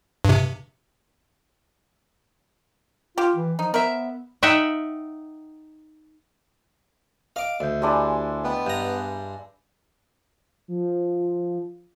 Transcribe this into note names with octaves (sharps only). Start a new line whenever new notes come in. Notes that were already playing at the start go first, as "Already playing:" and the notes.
G2 C3
F4 G4
E3
F3 D#4
B3 A#4 C5 E5
D#4 E5 F#5 G5
D#5 F5 D6
D2 D5 G6
G#3 D4 E4 G4 G#5
B3 D5 D#5 G5
G2 A#5 G6
F3